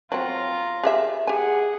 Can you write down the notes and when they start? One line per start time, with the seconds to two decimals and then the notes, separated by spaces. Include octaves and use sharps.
0.12 F#3 C4 F4 A#5
0.83 G4 G#4 E5
1.27 G4 G#4 F#5 G#5